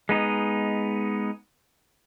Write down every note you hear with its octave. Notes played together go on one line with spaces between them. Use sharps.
G#3 B3 D#4